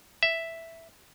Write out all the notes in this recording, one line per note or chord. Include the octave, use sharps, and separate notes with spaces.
E5